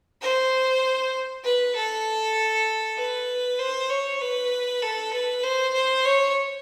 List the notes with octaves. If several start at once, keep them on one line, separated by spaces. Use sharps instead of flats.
C5
B4
A4
B4
C5
C#5
B4
A4
B4
C5
C5
C#5